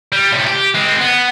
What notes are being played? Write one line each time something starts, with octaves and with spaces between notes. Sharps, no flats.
G3
A2 C3
G4
G#3 C4
B3